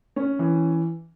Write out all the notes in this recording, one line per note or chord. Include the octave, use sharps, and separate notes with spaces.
C#4
E3